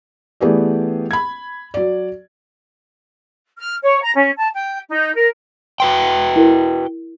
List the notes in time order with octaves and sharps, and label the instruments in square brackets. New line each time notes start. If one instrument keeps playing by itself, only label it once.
[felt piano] E3 A3 B3 G4 G#4 D5
B5 G#6
F#3 D5
[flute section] F6
C#5
A#5
C#4
A5
G5
D#4
A#4
[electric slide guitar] F#4 B4 G5 [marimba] C6
[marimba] E4 A#4